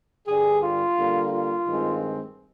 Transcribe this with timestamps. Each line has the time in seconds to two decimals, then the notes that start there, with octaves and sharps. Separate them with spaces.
0.27 G2 D3 G3 G#4
0.63 F4
0.97 D3 G3 A#3
1.32 F4
1.66 G2 D#3 G#3 C4